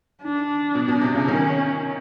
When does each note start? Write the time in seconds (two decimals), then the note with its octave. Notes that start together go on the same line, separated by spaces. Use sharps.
0.23 D4
0.75 B2
0.88 B2
1.01 C3
1.15 C#3
1.28 D#3 C#4